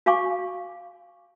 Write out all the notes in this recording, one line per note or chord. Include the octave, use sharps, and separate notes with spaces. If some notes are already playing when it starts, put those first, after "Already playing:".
F#4 F5 G#5 C#6 D6